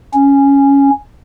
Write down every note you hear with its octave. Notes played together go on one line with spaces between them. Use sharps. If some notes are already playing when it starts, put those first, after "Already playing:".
C#4